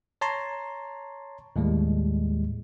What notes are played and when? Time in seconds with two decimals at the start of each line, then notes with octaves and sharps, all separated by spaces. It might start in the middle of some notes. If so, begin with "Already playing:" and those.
0.21 C#5 A5 A#5 C6
1.56 D#2 A2 G3 G#3